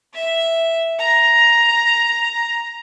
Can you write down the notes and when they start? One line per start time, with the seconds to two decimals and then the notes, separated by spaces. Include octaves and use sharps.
0.14 E5
0.99 A#5